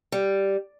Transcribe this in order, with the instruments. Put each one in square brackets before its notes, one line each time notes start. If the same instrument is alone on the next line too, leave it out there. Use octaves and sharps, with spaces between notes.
[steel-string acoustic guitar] G3